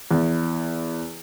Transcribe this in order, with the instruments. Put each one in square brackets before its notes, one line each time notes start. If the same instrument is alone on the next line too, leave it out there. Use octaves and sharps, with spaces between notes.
[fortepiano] E2